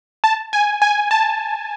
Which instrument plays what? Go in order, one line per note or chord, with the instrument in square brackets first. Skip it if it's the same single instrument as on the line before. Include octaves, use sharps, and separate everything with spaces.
[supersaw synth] A5
G#5
G#5
A5